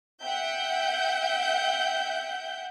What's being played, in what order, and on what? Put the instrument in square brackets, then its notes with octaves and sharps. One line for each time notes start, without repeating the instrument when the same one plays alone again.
[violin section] E5 F#5 G5 G6